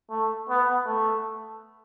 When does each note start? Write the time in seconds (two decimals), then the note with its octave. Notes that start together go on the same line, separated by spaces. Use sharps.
0.11 A3
0.49 B3
0.86 A3